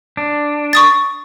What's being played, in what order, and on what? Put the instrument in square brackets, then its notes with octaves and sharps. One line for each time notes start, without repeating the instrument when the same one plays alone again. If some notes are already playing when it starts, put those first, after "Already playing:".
[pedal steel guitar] D4
[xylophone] C#6 D#6 A6